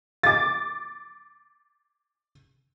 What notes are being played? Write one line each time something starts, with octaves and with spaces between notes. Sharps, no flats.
D6 A6